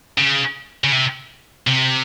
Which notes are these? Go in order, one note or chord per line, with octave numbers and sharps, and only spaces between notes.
C#3
C#3
C3
C3